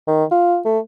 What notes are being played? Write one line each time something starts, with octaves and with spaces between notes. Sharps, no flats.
D#3
F4
A3